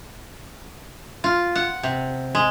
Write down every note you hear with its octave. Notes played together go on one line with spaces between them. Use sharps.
F4
F#5
C3
G#3